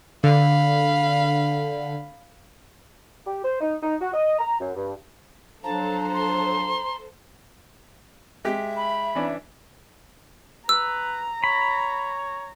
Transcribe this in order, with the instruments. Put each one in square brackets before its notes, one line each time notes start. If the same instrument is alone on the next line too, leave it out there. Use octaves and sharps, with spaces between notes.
[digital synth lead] D3 [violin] F5 B5
[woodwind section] G4
C5
D#4
D#4
F#4
D#5
A#5
F#2
G2
[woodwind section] F3 F#3 D4 [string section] A4 C5 [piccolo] A5 [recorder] A#5
[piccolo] C6
[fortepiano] G#3 G4 [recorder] E5
[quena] B5
[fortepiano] E3 C#4 D4
[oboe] B4 [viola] A#5 [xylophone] E6
[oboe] C#5 [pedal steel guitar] B5